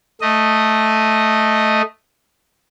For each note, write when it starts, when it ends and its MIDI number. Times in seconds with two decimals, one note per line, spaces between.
0.21 1.82 57
0.21 1.82 75